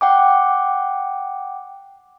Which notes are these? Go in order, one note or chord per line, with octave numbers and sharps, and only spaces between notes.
F#5 G5 D6